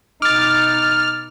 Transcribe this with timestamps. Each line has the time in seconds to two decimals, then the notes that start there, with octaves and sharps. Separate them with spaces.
0.22 B2 D#4 D6 F6 A6